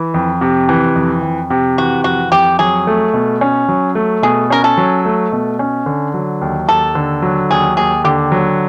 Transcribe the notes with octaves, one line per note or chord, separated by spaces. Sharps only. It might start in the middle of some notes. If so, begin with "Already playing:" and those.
Already playing: E3
F2
C3
E3
F2
F2
C3
E3 F#4
F2 F#4
F2 G4
F#3 G#4
A3
B2
C#4
F#3
A3
B2 G#4
C#4 A#4
A4
F#3
A3
B2
C#4
D3
F#3
D#2
D#2 A4
D3
F#3
D#2 G#4
D#2 G#4
D3 G4
F#3